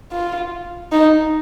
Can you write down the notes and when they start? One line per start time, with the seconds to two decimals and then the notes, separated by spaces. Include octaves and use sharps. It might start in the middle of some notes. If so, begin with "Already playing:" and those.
0.12 F4
0.92 D#4